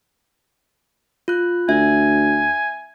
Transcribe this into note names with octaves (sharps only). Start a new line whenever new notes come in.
F4 F#6
D2 E5 G#5